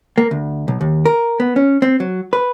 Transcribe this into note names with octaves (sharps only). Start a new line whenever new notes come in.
A#3
D2
B1
D#2
A#4
B3
C#4
C4
F#3
B4